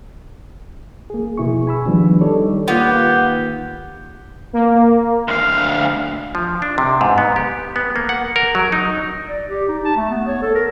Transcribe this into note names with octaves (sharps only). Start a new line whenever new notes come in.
A#3 G#4
F2 B2 E4 G#4 C#6
G#5 B5 E6
D#3 F3 G3 B3 D4
G3 D#4 A4 C#5 D5
D#3 A#3 B3 F4 G4
A#3
D2 F5
F3
D4
C3
G#2
B3
G4
B3
A#3
F#5
A#4
F#3
D#4
D5
G4
D#4
A5
A3
B3
C#5
A4
A#4